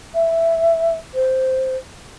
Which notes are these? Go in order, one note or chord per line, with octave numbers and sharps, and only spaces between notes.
E5
C5